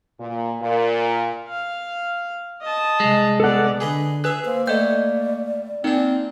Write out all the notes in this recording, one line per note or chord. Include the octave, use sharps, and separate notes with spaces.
A#2
A#2
F5
D#5 A5
C2 G#3
B3 A4 D5 F#5
D3 G#4 B4 D#5
G#4 B4 E5 F#6
A#3 C5
A2 A3 D5 D#5 G6
A#3 C4 D4 D#4